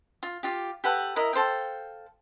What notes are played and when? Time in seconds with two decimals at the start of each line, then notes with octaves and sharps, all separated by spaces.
0.23 F4
0.43 F4 G4
0.84 G4 A4 B4 F#5
1.16 E4 A#4 D#5
1.33 A4 C5 F5 G5